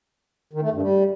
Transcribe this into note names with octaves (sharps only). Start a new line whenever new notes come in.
D#3
A3
G2
G3